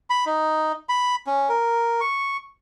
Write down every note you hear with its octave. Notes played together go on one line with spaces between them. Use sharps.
B5
D#4
B5
C#4
A#4
C#6